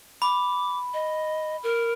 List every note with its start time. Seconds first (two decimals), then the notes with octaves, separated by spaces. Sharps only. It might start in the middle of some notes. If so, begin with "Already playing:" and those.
0.22 B5 D6
0.94 D#5
1.63 A#4